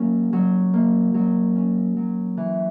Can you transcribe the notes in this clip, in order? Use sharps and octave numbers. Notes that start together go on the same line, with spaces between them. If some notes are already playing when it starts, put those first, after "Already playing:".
Already playing: F#3 A#3 C#4
F#3
A#3
F#3
C#4
F#3
E3